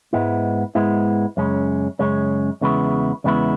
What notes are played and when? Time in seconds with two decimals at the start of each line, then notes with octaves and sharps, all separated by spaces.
0.13 G#2 G#3 B3 E4
0.75 G#2 G#3 B3 E4
1.37 F#2 C#3 G#3 C#4
1.99 F#2 C#3 G#3 C#4
2.61 E2 C#3 G#3 B3 E4
3.24 E2 C#3 G#3 B3 E4